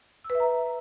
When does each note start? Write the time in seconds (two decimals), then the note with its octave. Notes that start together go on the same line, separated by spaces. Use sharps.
0.24 E6
0.30 B4
0.35 E5
0.40 A#5